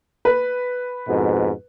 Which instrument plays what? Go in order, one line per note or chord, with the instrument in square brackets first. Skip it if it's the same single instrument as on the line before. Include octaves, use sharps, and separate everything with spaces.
[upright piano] B4
[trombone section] F2 G#2 B2